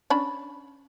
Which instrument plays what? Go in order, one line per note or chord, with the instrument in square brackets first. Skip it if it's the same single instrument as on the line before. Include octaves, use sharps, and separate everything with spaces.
[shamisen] C#4 D4 B5